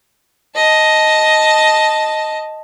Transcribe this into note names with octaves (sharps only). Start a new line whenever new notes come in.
D#5 A5